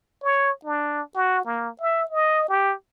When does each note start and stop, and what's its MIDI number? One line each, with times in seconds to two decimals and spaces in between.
0.23 0.51 73
0.65 1.02 62
1.15 1.44 66
1.45 1.70 58
1.81 2.05 76
2.11 2.45 75
2.49 2.74 67